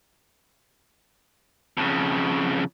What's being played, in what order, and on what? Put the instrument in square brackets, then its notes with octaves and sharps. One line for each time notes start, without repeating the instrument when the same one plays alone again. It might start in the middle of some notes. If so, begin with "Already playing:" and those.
[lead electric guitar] F2 C#3